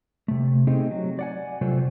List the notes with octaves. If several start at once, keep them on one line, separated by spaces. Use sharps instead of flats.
C3 A3
A3 C4 D#4 G4 G#4 D#5
F#3
D5 F#5 G#5
C3 F#3 A3 F4 C5